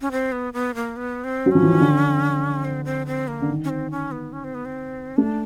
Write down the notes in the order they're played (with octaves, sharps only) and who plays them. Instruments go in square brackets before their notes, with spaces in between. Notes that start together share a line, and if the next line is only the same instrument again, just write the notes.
[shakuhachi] C#4
C4
B3
B3
A#3
B3
C4
[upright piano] F#3
[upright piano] F3 [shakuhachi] C#4
[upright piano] E3
D#3
D3
[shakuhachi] C4
C4
C4
A#3
[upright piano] D3
D#3
[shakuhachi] C#4
C4
C#4
B3
C#4
C4
B3
C4
[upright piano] A3 [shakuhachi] D4